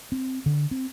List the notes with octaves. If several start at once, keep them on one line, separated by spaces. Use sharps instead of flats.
C4
D3
C4